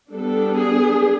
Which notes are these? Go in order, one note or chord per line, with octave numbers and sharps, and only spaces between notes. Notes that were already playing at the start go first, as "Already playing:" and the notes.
G3 B3 D4 A4
G#4